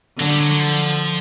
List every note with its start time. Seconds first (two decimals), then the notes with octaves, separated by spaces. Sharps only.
0.19 D3 F#3
0.29 G3
0.40 F#3
0.50 F#3
0.60 F3